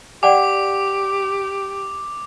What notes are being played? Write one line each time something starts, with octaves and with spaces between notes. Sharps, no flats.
G4 D5 F#5 G5 D6